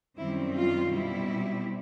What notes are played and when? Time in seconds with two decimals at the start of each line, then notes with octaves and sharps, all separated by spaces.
0.18 F#2 D#3 G3 C4 E4
0.55 F4
0.92 B2 G3 C4 E4